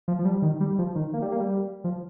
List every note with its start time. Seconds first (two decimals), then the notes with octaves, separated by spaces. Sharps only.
0.08 F3
0.19 F3
0.25 G3
0.42 D#3
0.60 G3
0.79 F3
0.96 D#3
1.14 A#3
1.22 G3
1.32 A#3
1.40 G3
1.84 F3